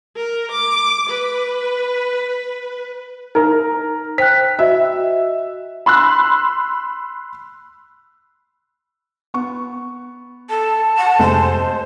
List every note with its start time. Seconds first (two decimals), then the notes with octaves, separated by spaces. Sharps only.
0.16 A#4
0.52 D6
1.09 B4
3.35 D#4 A#4 A#5
4.18 C5 G5 F#6 B6
4.59 F#4 D#5 E5
5.86 B5 C6 E6 F#6
9.34 B3 C#6
10.50 A4 A5
10.97 F#5
11.19 F2 C3 G#3 A3 C5